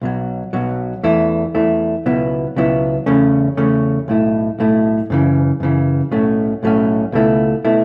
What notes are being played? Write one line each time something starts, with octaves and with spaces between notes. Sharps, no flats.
B1 B2 F#3
B1 B2 F#3
E2 E3 A3 E4
E2 E3 A3 E4
C#2 B2 F#3 B3 E4
C#2 B2 F#3 B3 E4
E2 C#3 A3 C#4
E2 C#3 A3 C#4
B1 A2 A3 E4
B1 A2 A3 E4
F#2 C#3 E3
F#2 C#3 E3
B1 A2 F#3 A3 C#4
B1 A2 F#3 A3 C#4
C#2 B2 A3 E4
B2 A3 E4